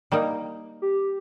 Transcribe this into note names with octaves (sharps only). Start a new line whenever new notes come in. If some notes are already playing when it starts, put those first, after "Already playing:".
G3 A#3 D#4
G4